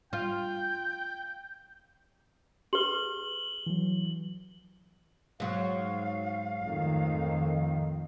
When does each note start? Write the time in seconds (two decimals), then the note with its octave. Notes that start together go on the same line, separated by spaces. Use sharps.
0.13 F4 G5
2.73 G4 G#4 B4 F#7 G7
3.67 E3 F#3
5.40 G#2 F#3 F5
6.60 F2 A2 D#3